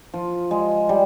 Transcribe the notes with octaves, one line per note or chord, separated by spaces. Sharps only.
F3
G#3
G3